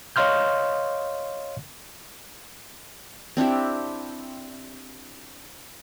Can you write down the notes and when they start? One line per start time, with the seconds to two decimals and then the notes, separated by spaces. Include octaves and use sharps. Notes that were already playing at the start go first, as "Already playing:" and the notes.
0.16 C#5 D#5 F5 C6 F6 G6
3.37 C4 D4 E4 G4